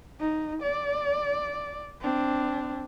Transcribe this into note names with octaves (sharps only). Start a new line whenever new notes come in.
D#4
D5
C4 D4